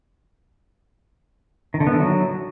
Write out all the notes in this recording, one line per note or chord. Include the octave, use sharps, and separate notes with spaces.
D#3
D3
B3
E3
F#3